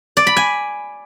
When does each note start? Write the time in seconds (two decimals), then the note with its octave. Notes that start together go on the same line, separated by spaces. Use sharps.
0.17 D5
0.27 B5
0.37 G#5